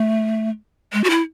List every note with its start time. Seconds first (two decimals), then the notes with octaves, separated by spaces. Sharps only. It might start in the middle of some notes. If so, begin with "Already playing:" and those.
Already playing: A3
0.93 G#3
1.04 F#4
1.10 E4